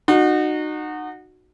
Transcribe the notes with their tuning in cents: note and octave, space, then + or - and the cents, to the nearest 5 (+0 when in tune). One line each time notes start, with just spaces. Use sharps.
D#4 -30 F#4 -10